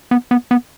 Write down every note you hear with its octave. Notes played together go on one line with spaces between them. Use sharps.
B3
B3
B3